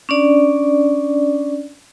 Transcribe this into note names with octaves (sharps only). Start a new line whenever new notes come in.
C#4 D4 D5